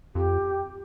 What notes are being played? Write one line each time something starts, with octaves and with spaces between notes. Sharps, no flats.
F2 G4